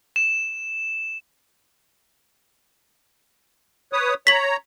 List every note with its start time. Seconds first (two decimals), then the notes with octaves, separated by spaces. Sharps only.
0.16 E7
3.93 B4 C#5 D#6
4.27 C#5 A#5 B6 F#7